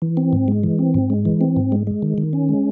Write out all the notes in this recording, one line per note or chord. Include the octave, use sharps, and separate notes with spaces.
E3
C4
G#2
G#3
E3
C4
G#2
G#3
E3
C4
G#2
G#3
G#3
D#3
D#3
C#4
G#3